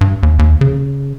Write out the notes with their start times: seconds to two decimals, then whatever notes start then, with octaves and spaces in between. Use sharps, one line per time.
0.01 G2
0.23 D#2
0.39 D#2
0.61 C#3